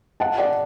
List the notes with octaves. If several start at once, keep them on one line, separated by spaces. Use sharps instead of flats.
F#5 A5
D5 F#5